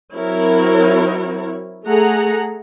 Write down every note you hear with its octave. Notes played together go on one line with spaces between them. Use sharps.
F#3 C4 E4 A#4 C#5
A3 G#4 A4 F#5 A#5